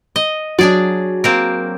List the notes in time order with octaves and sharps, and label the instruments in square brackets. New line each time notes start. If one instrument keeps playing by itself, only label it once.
[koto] D#5
[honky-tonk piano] F#3 [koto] D4 G#4 D5
[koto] A#3 C4 A#4